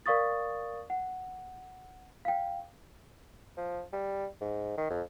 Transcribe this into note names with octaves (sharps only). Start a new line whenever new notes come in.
A#4 D5 F5 C#6 D#6 A6
F#5
F5 G5
F3
G3
G#2
D#3
F2